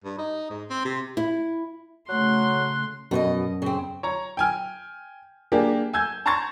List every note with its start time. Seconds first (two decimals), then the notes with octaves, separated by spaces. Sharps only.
0.04 G2
0.18 D#4
0.50 G#2
0.70 C4
0.85 C3
1.17 E4
2.08 C#3 F#3 A3 C6 F#6
3.11 F#2 B2 C5 D#5
3.62 C#3 C4
4.03 C#5 A#5
4.37 G5 G#5 F6
5.52 A#3 D4 G4 G#4
5.93 G#5 E6 G6 G#6
6.26 A5 A#5 C6 C#6 G#6 A6